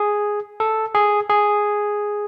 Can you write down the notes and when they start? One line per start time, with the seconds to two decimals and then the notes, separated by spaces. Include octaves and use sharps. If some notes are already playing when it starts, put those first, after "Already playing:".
Already playing: G#4
0.60 A4
0.95 G#4
1.30 G#4